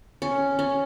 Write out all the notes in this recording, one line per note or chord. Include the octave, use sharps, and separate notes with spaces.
C#4
C#4